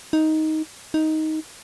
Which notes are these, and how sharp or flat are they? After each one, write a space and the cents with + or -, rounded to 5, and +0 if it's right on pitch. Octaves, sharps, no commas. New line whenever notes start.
D#4 +10
D#4 +10